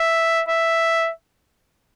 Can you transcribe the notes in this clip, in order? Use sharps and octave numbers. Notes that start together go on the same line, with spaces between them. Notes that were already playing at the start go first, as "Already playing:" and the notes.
Already playing: E5
E5